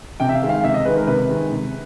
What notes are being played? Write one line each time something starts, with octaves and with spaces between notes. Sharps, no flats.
C3 G5
E5
F5
D#3 G#3
F5
C3 E5
D#5
D#3 G#3 B4
A#4
C3 B4
D#3 G#3
C3